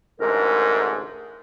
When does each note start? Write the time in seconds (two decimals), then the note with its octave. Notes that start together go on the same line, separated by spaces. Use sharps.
0.20 A1 D2 G#2 A#4